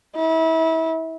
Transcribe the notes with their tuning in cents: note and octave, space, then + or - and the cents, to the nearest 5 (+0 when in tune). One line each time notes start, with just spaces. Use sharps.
E4 -30